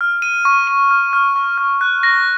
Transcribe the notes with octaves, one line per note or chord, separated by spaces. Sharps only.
F6
D#7
C#6
D#7
F6
F6
C#6
F6
F#6
A#6